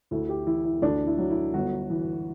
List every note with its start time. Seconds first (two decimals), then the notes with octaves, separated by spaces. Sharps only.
0.11 D2 E4
0.29 G4
0.47 E3 E4
0.65 E4
0.82 D2 D4
1.07 E4
1.18 F#3
1.30 E4
1.54 G1 F#4
1.90 E3